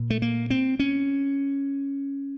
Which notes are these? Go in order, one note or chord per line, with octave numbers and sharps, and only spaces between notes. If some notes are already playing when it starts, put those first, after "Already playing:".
Already playing: A#2
A3
A#3
C4
C#4